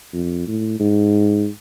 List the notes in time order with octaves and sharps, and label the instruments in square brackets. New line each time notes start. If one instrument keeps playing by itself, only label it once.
[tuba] F2
A2
G#2